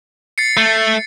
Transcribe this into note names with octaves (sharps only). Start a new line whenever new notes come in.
A6 C7 C#7
A3